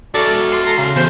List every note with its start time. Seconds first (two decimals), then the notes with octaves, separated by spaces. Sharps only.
0.14 D4 F#4 A4 D5 E5 C#6
0.52 C6
0.66 A4 A#5
0.78 C#3 F5
0.96 E2 C5